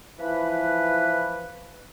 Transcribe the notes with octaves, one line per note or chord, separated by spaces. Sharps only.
E3 F3 B4